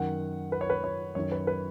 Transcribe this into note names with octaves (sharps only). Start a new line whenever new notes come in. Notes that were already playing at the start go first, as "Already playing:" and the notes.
Already playing: F#2 D#3 F#5
B4
C#5
B4
C#5
F#2 D#3 C#5
B4
B4